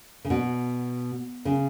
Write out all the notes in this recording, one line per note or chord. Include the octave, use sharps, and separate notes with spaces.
C#3
B2
C#3